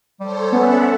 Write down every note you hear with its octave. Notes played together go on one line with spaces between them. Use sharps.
G3 A4 C5 C#5
B3 C#4 A4 E5 F#5